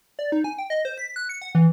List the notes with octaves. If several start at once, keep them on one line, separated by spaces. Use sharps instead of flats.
D5
D#4
G#5
G5
D#5
C5
B6
F#6
C#7
F#5
E3